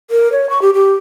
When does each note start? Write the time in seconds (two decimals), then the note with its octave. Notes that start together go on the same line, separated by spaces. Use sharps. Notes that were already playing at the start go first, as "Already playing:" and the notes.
0.11 A#4
0.32 C#5
0.50 C#6
0.62 G4
0.74 G4